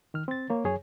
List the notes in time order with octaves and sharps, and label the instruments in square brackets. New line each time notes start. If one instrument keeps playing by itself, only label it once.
[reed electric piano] D#3 F6
C4 A6
A#3 C#5
F#2 G#4 C#5 G#5